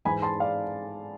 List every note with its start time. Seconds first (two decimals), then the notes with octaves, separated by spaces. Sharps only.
0.05 G#2 E3 G#5 B5
0.22 A5 C6
0.40 D5 F5